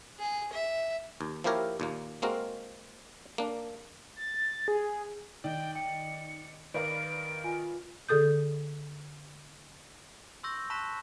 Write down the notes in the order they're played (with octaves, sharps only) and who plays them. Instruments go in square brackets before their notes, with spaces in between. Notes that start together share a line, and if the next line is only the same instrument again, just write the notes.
[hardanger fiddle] G#4
E5
[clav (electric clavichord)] D#2
F3 A#3 E4 G4 A#4 C#5
D#2 A#2 A#3
G#3 A#3 C4 F#4 A#4
A#3 D4
[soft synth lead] A6
G#4
[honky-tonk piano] D#3 [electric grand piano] D5 D#5 [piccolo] G5
[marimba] G5 [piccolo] C#7
[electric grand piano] D#3 A#4 [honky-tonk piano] B4 D5 F5 [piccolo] D7
[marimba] F4 G#5
D3 G#4 A4 D#6 G6
[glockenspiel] C6 C#6 E6 G6 A#6
A5 B5 C#6 F#6 B6 E7